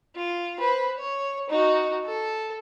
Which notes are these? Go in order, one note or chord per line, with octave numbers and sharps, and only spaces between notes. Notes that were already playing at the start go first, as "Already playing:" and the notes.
F4
B4 C5
C#5
D#4 F#4
A4